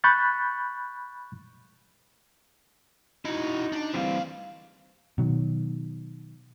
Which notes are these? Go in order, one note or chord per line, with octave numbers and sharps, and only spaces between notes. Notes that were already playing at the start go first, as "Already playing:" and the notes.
B5 C#6 F#6 G6 A6
D#4 E4 F#4
D4
D2 E3 G3 C4 F5
B2 D#3 F#3